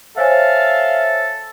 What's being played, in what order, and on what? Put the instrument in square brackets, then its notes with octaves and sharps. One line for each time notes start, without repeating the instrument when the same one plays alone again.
[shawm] A4 [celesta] C5 C#5 G#5 [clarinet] E5 [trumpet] F5